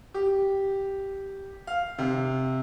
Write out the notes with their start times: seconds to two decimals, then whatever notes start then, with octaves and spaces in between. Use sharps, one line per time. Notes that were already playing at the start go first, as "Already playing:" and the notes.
0.14 G4
1.67 F5
1.98 C3